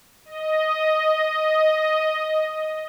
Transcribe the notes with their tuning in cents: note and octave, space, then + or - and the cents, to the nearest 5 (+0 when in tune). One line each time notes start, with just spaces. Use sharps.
D#5 +5